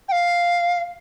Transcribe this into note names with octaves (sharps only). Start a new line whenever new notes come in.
G5
F5